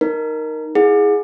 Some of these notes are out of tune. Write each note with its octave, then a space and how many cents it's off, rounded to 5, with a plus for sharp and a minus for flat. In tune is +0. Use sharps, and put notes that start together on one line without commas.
D#4 +0 A#4 +0
E4 -25 G#4 +0 F#5 -35